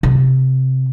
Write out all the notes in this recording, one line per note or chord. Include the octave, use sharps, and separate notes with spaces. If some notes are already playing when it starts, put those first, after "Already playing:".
C3